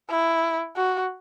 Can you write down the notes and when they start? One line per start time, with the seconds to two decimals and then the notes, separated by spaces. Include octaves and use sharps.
0.10 E4
0.76 F#4